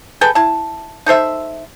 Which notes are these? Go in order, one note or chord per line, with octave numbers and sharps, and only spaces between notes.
G#4 A4 B4 G5
E4 A5
D#4 A4 C5 E5